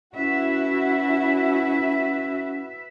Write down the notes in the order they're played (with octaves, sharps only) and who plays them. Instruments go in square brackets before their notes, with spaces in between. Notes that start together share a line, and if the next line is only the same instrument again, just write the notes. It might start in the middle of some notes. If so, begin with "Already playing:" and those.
[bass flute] C#4 [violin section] E4 F#4 [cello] B4 E5